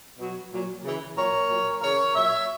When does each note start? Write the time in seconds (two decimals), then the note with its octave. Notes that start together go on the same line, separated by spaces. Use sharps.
0.18 B2 F#3
0.51 A#2 F#3
0.83 C#3 E3
1.16 A#2 F#3 A#4 C#5
1.49 A#2 F#3
1.81 C#3 E3 A#4 C#5
2.14 A#2 F#3 C#5 E5